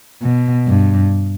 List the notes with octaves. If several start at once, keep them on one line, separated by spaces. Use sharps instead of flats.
B2
G2